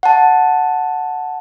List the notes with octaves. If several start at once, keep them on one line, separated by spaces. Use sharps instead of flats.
F#5 A5